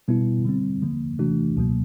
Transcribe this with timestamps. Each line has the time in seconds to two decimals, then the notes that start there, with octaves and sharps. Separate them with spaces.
0.08 B2 G3 B3 E4
0.45 D3 G3 C4
0.82 D3 F3 A#3
1.19 C3 E3 A3 D4 F#4
1.57 C#2 B2 F#3 A#3